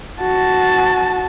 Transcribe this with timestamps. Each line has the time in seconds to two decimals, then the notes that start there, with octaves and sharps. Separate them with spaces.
0.20 F#4 A5